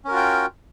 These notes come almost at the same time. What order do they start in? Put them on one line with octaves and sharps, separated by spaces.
C#4 A#4 F#4 F4 G5